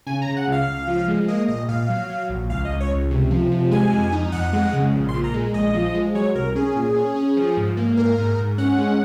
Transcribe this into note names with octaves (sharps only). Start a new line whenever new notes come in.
C#3 G#5
C#3 A#5
F#5
C#2 F5
C#2
F3
G#3
A#3 D#5
A#1 D#5
A#2 F5
F#3
F#3
A#1
C#2 F5
D#5
C#2
C#5
C#2
C3
F3
C3
G#3 G#5
F2
D#4
F2 F#5
G#3
C#3
A#1
C6
A#2
A#5
G#3
A#1 D#5
F3
G#3
F#3 C#5
C2 A#4
C#4 G#4
A#2
C#4
C#4
F3
G#2
A#3
G#2 A#4
G#2
G#2
C#4 F#5
G#3